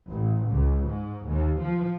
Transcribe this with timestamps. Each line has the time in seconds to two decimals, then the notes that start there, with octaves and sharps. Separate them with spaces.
0.10 A1
0.50 C#2
0.88 G#2
1.29 D#2
1.62 F3